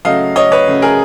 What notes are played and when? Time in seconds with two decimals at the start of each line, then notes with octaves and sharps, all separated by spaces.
0.05 C#3 F#3 A3 D#5 F5
0.36 C#5 D#5
0.52 B4 C#5
0.67 C#3 F#3 A3
0.82 G#4 A#4